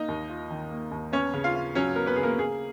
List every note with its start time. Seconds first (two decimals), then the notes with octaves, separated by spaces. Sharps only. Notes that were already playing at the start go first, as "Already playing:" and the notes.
Already playing: A#3 D#4 D#5
0.08 D#2
0.29 F4
0.50 D#3
0.71 A#3
0.91 D#2
1.12 B3 C#4 C#5
1.34 C#3
1.44 F4 F5
1.55 F4
1.75 F#3 C#4 C#5
1.96 B3 A#4
2.06 B3 B4
2.16 C#3 G#4
2.23 A#3 A#4
2.38 A#3 G#4